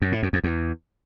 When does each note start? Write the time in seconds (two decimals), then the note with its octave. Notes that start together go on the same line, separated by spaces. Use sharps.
0.02 F#2
0.12 A2
0.23 F#2
0.33 F2
0.44 E2